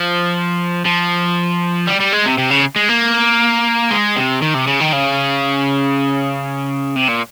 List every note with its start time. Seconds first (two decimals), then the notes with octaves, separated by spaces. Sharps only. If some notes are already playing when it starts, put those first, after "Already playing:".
Already playing: F3
0.86 F3
1.87 G3
2.00 G3
2.13 G#3
2.25 C3
2.38 C3
2.50 C#3
2.76 G#3
2.89 A#3
3.91 G#3
4.16 C3
4.42 D#3
4.54 C3
4.67 C#3
4.80 D#3
4.93 C#3
6.96 C3
7.09 A#2